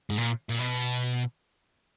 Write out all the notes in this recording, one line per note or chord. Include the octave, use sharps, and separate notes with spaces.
G#2
A#2
A#2
B2